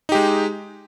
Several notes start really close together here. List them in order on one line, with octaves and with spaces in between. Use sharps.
D#4 G4 G#3